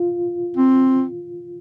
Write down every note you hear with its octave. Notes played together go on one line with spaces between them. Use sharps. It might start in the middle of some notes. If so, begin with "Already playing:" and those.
Already playing: F4
C4